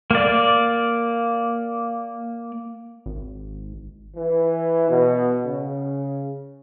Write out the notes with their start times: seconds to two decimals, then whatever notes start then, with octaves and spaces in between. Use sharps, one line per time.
0.11 A#3 D5
3.06 G#1
4.16 E3
4.90 B2
5.44 C#3